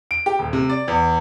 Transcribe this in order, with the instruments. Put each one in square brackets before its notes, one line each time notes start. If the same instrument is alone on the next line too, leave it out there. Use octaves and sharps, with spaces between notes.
[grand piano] D7
G4
D#1
C3
D5
E2